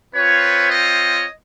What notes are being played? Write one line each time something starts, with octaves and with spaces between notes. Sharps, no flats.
C4 F4 B4 C#5
C#5 D#5